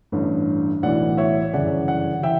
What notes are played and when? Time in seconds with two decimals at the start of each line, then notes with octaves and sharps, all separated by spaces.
0.12 A1 G2 D3
0.83 B1 A2 E3 D5 F#5
1.18 C#5 E5
1.53 G1 F#2 C#3 E3 D5 F#5
1.88 D5 F#5
2.23 E3 E5 G5